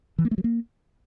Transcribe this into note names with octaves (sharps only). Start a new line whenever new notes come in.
E3
A#3
A3
F#3
A#3